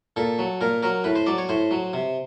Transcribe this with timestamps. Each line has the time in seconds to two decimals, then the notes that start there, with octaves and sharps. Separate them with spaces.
0.16 A#2 A4
0.39 F#3
0.61 A#2 A#4
0.83 F#3 A#4
1.04 A2 B4
1.16 C5
1.27 F#3 D5
1.38 C#5
1.49 A2 C5
1.71 F#3
1.93 C3